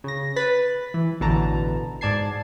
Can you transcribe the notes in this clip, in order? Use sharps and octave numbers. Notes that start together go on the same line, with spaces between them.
C#3 A#6
B4 A6 B6
E3
A1 B2 D3 E3 A5 A#5
G#2 D5 A5 G#6 C7